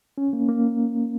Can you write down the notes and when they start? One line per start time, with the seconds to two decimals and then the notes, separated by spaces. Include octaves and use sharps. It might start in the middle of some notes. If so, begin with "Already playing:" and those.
0.18 C#4
0.33 A#3
0.48 A#3